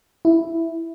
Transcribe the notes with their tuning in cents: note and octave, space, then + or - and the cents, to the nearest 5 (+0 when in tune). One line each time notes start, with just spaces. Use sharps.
E4 +0